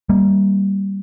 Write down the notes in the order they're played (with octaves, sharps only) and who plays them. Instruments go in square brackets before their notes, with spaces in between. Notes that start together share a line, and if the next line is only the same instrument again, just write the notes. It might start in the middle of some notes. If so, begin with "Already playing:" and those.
[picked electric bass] G3 A#3